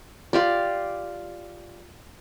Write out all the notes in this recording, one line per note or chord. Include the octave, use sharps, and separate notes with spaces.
F4 G4 D5